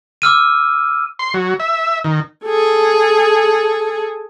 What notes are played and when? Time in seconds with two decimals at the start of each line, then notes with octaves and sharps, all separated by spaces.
0.22 D6 E6 F6 D#7
1.19 C6
1.34 F#3
1.60 E5
2.04 D#3
2.45 G#4 A4